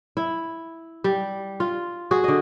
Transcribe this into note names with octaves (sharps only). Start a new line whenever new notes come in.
E4
G3
F4
F#4 G#4
D3 D#5